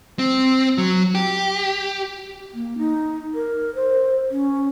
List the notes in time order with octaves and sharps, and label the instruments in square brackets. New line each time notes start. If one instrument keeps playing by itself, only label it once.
[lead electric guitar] C4
F#3
G4
[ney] A#3
D#4
A#4
C5
C#4